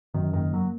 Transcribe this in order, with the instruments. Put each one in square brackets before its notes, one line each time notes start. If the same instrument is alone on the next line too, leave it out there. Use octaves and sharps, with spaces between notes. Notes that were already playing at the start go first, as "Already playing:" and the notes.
[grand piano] F#2 [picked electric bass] D#3
[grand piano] F#1 [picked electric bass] D#3
[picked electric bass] F#3 [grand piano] A#3